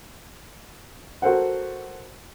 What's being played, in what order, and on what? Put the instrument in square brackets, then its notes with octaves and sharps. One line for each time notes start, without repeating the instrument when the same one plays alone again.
[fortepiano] F#4 A4 A#4 C5 F#5